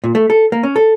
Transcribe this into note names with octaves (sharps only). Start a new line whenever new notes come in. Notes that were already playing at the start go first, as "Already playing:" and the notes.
A#2
A3
A4
A#3
C#4
A4